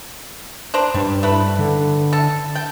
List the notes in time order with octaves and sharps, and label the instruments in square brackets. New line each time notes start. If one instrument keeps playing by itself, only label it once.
[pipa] D4 C5 A#5
[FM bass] G2 [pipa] G3
[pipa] A3 E4 B4
[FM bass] D3
[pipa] A4
G5